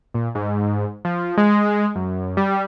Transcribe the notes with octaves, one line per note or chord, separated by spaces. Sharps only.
A#2
G#2
F3
G#3
F#2
G3